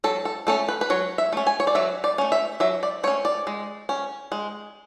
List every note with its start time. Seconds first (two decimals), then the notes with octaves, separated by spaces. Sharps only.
0.04 F#3 A4
0.25 A4
0.47 A3 C#4 A4
0.68 B4
0.81 B4
0.90 F#3 C#5
1.18 E5
1.33 A3 C#4
1.47 G#5
1.60 C#5
1.67 D5
1.75 F#3 E5
2.04 D5
2.18 A3 C#4
2.32 E5
2.60 F#3 E5
2.83 D5
3.03 A3 C#5
3.07 C#4
3.25 D5
3.47 G#3
3.89 C#4
4.32 G#3